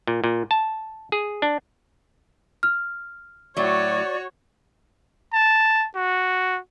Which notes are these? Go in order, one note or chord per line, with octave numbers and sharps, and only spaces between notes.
A#2
A#2
A5
G#4
D4
F6
A2 F#3 F#4 C#5 D5
A5
F#4